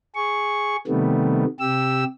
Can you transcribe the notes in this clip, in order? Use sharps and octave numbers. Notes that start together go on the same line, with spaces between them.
G#4 C#6
C3 D#3 G3 A3 B3
C3 G4 E6